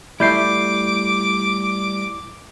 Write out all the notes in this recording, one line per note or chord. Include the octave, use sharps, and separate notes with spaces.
G3 A3 E4 E5 D6 G6 C7